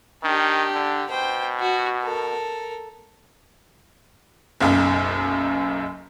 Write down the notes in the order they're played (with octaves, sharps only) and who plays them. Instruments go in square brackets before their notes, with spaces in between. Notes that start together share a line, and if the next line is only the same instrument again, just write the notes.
[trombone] D#3 [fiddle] D4 G4
[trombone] D3
[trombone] B2 [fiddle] C5 G5
[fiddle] F#4
A4 A#4
[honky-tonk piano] F#1 B1 F#2